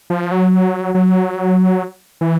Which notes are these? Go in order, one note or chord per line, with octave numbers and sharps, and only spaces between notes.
F3
F#3
F#3
E3